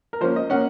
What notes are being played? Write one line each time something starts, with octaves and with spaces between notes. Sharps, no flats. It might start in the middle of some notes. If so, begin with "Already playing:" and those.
A#4
F3 A#3 C#4 C5
D#5
A#3 C#4 F#5